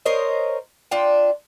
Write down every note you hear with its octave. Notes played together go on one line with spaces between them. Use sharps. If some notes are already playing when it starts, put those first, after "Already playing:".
A#4 C5 C#5 D#5
D4 F4 G5